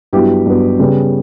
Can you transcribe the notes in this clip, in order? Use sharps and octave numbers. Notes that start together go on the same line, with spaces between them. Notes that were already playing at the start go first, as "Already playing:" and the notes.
G2 F#3 B3 E4 G4
G2 F#3 B3
C#3 G3 B3